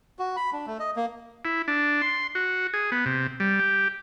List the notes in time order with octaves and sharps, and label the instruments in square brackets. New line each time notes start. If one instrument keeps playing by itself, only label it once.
[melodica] F#4
B5
D4
A3
D#5
A#3
[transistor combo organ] E4
D4
C6
F#4
G#4
B3
C3
G3
G4